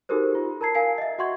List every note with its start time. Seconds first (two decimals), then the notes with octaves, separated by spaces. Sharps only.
0.09 D#4 F#4 G4 A4 A#4 C5
0.35 F4
0.61 A#4 A5 A#5 G#6 C7
0.75 A#4 F5 G#5 C7
0.98 D#5 E5
1.19 F#4 E5 F#5 C6 C#6 G#6